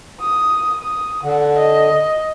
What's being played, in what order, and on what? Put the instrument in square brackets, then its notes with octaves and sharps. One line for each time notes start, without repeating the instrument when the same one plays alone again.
[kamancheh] D#6
D#6
[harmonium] D3 [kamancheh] F#5
[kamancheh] D#5